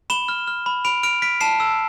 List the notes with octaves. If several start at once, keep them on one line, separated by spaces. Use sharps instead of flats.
B5 E7 G7
F6
F6
B5
B5 D7 F7
F6 D7 F7
F6 B6 D7
A5 C7 E7
E6